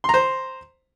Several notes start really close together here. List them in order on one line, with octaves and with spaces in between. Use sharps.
C6 A#5 C5